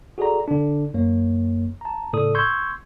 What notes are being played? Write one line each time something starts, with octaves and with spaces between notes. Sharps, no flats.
F#4 G#4 A4 D5 A#5
D3 D4
F#2 A#3 C#5
A5 A#5
A2 C#3 A4 D5 D#6
C6 C#6 E6 G6 G#6